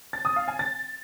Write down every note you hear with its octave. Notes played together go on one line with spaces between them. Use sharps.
A6
D#6
F5
G#5
A6